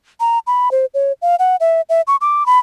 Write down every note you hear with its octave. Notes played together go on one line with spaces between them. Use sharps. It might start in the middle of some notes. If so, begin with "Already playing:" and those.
A#5
B5
C5
C#5
F5
F#5
E5
E5
C#6
D6
B5